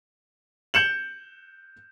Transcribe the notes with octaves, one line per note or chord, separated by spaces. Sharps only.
G6 C#7 E7 F#7